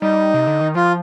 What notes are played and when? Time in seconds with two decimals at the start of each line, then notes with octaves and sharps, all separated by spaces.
0.02 G3 D#4
0.34 C3
0.47 D3
0.61 D#3
0.75 F3 F4